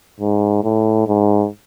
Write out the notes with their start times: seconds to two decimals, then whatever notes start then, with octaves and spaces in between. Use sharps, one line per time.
0.20 G#2
0.64 A2
1.07 G#2